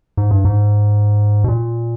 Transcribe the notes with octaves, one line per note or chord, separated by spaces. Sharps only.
G#2
G2
G#2
B2
A#2